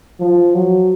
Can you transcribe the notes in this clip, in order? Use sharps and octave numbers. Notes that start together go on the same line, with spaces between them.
F3
F#3